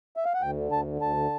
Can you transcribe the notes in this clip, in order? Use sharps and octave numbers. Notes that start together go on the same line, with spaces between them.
E5
F5
F#5
D2 G5
D3
D2 A5
D3
D2 A5
D3